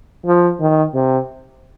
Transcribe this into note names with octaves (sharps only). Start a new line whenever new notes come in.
F3
D#3
C3